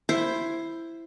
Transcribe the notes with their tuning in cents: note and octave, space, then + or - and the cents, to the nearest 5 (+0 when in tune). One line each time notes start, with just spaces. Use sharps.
E4 +10 C5 +5